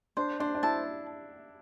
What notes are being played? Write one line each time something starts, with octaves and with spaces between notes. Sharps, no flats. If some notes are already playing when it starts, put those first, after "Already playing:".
D4 C5
D4 C5
D4
E4 A5